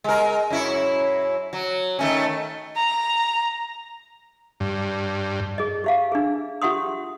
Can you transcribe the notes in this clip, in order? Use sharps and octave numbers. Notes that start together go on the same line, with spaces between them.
G#3 A#4
F#2 E4 C#5
F#3
D#3 A3 C#4
A#5
G2
G#4 D#5
G4 E5 F5
D4 G#4
F4 G4 E5 F#5 C6 D#6